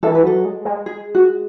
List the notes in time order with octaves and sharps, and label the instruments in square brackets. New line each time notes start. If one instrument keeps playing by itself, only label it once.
[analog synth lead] E3 [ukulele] A4
[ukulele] B4
[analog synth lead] F#3 [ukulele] A4
[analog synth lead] G#3
G#3
[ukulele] G#4
F#4